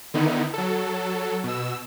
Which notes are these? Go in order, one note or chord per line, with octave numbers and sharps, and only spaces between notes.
D3 D#3 B3 D#4 E4
F#3 A4
B2 E6